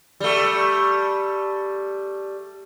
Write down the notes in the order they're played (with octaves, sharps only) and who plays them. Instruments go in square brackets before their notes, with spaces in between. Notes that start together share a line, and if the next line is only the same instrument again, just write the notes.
[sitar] G3 A3